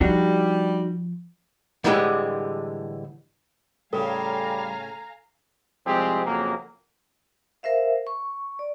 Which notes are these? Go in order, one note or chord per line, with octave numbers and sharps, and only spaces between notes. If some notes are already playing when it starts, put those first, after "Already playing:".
F3 G3 D4 D#4 F#4
A2 D3 E3 G3 G#3 G4
A2 C#3 G3 A4 F5 G#5 A#5
C2 F3 G#3 C4 G4 G#4
F2 C#3 F#3 A#3
A#4 C5 E5 F5
C#6
D5